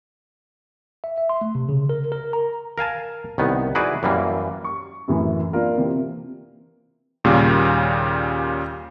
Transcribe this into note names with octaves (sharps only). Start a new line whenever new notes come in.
E5
E5
C6
A3
C3
C#3
A#4
A#4
A#5
A#4 F5 G#5 A5
C2 D#3 B3
D#4 E4 F#4 G#4 B4 D5
F#2 E3 G3 A#3
C#6
F#2 A2 E3
A#3 D4 F4 A#4
C3 E3 A#3 C4
D#2 A#2 C#3 G3